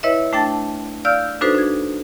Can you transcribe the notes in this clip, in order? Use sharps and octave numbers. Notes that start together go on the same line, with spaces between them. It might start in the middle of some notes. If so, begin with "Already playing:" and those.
E4 B4 C#5 D#5 E5
A3 D4 G5 A5 A6
D5 F5 E6 F6 G6
D4 D#4 F#4 A4 B4 C5
D4 G#6